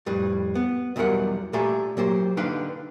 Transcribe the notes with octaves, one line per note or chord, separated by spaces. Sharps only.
F2 A2 G3 B4
B3
B1 E2 E3 G3 A#4 F#5
A#2 A3 G4 A4 G#5 A#5
F#3 A#3 G4 C5
D3 D#4 B4 F5 G5 C6